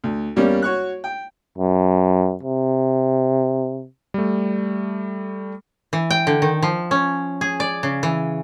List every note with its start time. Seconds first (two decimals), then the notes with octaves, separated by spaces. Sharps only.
0.04 D2
0.36 E2 G3 A#3 C#4 D5
0.62 F#4 C#5 C#6 F#6
1.04 G5
1.58 F#2
2.43 C3
4.14 G3 A3
5.93 E3
6.10 G5
6.27 D3
6.42 D#3
6.62 F3
6.91 C#4
7.41 G#4
7.60 D5
7.83 C#3
8.03 E3